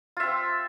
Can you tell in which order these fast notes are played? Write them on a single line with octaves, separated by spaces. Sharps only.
F4 E5 C4